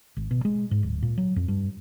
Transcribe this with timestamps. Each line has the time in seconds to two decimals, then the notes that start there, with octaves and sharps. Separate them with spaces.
0.17 G#1
0.31 B2
0.45 G#3
0.71 G#2
0.83 D1
1.02 A#2
1.18 F#3
1.36 F2
1.48 G2